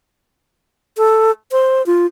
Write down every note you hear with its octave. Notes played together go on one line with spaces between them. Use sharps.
A4
C5
F4